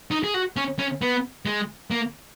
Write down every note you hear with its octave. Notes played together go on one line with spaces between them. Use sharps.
D#4
G#4
F#4
C#4
C#4
B3
G#3
A#3